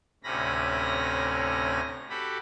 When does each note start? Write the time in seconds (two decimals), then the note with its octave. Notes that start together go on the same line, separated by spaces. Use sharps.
0.24 D2 A2 C3 C#4 B5 A#6
2.09 F#4 G4 A4 B5